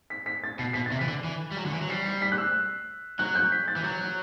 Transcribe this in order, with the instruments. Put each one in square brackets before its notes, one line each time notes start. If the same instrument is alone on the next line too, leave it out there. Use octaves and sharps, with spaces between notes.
[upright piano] B6
B6
A6
[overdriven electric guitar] B2 [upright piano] C7
[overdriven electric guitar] B2 [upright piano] B6
[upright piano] A6
[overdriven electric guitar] C3
[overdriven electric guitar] E3 [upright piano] B6
[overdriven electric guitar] D3
E3
G3
F#3
D3
E3
F#3
[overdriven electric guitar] G3 [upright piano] C7
[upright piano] C7
B6
F#6
E6
[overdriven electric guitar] F#3 [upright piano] F#6
[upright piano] G6
B6
A6
[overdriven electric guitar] E3
[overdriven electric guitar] F#3 [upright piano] G6
[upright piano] F#6